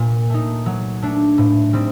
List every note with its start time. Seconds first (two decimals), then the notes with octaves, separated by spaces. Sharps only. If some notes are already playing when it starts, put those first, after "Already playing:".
Already playing: A#2
0.30 A3 D#4
0.66 F#3
1.02 A3 D4
1.38 A2
1.73 G3 C4 D#4